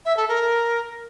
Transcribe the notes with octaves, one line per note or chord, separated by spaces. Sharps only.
E5
A4
A#4